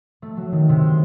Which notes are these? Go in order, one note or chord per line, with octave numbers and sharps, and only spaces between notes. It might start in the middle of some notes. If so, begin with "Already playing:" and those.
A3
F#3
D#3
C3
C6